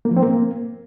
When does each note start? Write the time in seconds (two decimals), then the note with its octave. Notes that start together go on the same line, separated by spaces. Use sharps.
0.05 A#3
0.11 F3
0.16 C4
0.22 A#3